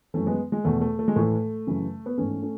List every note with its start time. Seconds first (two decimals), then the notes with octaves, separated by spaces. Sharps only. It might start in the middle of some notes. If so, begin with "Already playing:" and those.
0.14 F#2 E3 A3 C#4
0.26 G#3 B3
0.52 G#3
0.65 E2 B2 A3
0.81 A3
0.99 A3
1.08 G#3
1.16 A2 E3 A3
1.67 F#2 C#3 E3
2.06 B3
2.18 G#2 E3 A3 C#4
2.42 A3 C#4